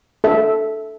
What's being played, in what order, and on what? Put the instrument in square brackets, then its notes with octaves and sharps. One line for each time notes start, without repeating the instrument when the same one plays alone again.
[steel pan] A4 E5